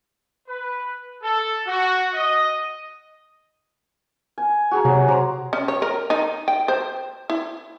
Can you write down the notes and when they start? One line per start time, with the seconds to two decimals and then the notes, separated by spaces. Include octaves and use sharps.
0.48 B4
1.23 A4
1.67 F#4
2.14 D#5
4.38 G#5
4.71 F#4 G#4 A#5
4.85 C3 F#3
5.08 C5 A#5 D6
5.53 C#4
5.68 C#5
5.82 A#4
6.10 D#4
6.48 G5
6.68 C5
7.30 E4